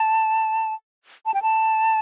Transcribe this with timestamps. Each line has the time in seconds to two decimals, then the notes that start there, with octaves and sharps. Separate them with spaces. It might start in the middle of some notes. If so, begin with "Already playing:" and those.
Already playing: A5
1.26 A5
1.34 G5
1.42 A5